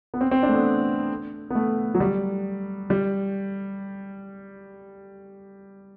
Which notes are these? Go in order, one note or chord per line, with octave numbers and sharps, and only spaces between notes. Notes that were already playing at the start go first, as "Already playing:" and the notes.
B3
C4
C4
D4
A3
B3
B3
A3
F#3
G3
G3